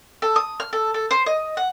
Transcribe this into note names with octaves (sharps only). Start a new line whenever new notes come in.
A4
D#6
F6
A4
A4
C5
D#5
F#5